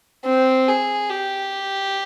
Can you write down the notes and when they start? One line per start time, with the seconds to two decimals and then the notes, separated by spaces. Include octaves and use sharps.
0.25 C4
0.68 G#4
1.10 G4